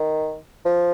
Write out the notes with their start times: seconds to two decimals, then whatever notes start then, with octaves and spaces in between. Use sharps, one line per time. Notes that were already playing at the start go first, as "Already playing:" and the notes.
Already playing: D#3
0.65 F3